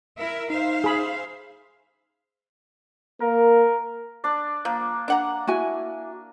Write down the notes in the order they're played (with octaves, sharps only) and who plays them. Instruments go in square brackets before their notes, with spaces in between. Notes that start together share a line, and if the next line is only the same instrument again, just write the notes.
[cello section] E4 A#4 E5
[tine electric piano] D#4 [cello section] C5 E5 F5
[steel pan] G#4 B5
[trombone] A#3 [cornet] A#4
[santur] D4 D5
[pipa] F3 [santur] A#3
[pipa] D4 F#5 A#5
[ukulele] E4 F#4 G#5